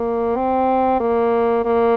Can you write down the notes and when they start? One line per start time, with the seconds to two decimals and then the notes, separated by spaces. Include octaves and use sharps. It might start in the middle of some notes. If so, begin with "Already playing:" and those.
Already playing: A#3
0.36 C4
1.00 A#3
1.65 A#3